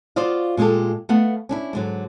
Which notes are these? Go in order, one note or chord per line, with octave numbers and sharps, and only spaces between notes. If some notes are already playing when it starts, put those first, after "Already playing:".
F4 F#4 C5 D5 D#5 F5
A#2 G#3 F4 G4 A4
A3 B3 F5 F#5
C#4 D4 E4
G#2 D3 F#3